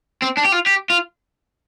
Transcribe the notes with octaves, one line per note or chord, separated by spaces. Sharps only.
C4
D4
G4
F4
G4
F4